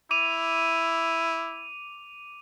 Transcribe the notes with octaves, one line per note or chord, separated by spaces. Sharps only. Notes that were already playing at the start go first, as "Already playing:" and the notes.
E4 D6 D#7 F7